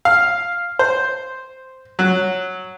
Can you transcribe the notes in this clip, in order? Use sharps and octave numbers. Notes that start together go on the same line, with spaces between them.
F5
C5
F#3